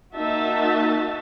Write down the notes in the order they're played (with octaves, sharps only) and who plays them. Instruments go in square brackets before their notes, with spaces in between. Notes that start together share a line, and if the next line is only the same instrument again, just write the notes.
[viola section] A#3 D#4 F#4 E5 A5